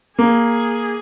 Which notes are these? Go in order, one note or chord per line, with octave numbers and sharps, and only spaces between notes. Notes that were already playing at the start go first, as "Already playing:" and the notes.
A#3 G#4